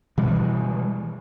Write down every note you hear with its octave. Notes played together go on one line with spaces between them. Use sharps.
B2 E3 G3 G#3